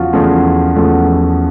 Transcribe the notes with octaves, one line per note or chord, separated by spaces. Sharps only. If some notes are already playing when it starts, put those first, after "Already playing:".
Already playing: E2 C#3 F3 F4 F#4
E2 C#3 F3 A3 F4
E2 C#3 F3 A3